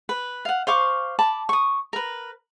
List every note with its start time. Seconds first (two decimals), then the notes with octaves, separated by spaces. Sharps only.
0.09 B4
0.45 F5 F#5
0.67 C5 F5 C#6 D6
1.19 A5 B5 D6
1.49 C#6 D#6
1.93 A#4 B4